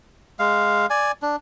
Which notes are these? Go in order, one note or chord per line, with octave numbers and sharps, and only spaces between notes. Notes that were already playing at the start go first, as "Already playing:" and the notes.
G#3 F5
D5 G#5
D4